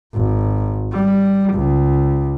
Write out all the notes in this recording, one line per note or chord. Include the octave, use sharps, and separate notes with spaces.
G#1
G3
C#2